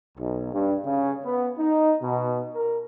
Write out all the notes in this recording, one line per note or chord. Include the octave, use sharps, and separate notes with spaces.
B1
G2
C#3
B3
D#4
B2
A#4